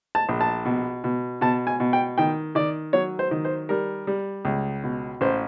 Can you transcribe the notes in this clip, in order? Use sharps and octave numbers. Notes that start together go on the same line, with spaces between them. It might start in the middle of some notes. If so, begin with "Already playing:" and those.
A5
A#1
A5
B2
B2
B2 A5
G#5
B2
G5
D#3 G5
D#3 D5
F#3 C#5
C5
D#3
C5
G3 A#4
G3
C#2
B2
A1 C5